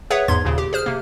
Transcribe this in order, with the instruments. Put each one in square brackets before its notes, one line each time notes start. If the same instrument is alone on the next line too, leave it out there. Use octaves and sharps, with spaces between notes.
[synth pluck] G#4 B4 C#5 E5 F#5
E2 G#2 C6 G#6
D#2 A#2 C#3
G4
G#4 C5 F6
C3 A#3